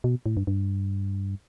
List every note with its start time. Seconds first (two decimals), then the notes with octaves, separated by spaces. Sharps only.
0.04 B2
0.26 A2
0.37 G2
0.47 G2